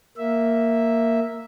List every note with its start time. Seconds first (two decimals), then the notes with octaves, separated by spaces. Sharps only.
0.17 A#3 E5